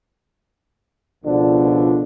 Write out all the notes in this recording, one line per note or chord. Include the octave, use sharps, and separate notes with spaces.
C#2 B2 D3 F3 D4